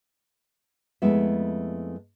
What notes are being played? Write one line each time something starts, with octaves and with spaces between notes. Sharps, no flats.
F2 G#3 A3 B3 E4 E5